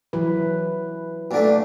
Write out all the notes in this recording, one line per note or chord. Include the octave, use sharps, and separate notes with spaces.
E3 F#3 B4
A#2 D3 A3